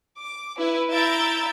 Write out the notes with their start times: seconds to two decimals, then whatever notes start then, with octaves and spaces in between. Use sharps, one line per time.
0.18 D6
0.58 E4 B4
0.90 E4 E5 A#5 G6 A6 D7